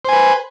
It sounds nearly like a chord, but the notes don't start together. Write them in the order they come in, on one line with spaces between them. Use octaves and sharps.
C5 G#5 B4